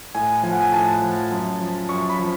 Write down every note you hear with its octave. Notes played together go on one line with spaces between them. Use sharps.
A2 G#5
F3 G#5
F#5
G#5
A2 A5
F3
F#2
F3
F#2 C#6
B5
F3